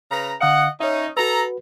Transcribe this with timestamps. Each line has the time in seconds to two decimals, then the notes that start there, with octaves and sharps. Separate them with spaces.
0.11 C#3 B4 A#5
0.41 D3 D#5 F5 F#5
0.80 C#4 D#4 C#5 E5
1.17 F#4 A4 B4 A#5